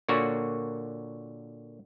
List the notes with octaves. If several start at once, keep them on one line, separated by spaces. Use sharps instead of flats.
A#2 D3 A#3 F#4 C#5